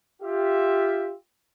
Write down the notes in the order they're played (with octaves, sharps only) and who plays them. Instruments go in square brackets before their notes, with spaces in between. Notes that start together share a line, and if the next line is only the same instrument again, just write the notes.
[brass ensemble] F4 G4 E5